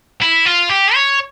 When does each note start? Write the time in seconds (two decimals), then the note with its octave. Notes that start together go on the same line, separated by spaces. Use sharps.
0.22 E4
0.46 F4
0.70 G4
0.95 C#5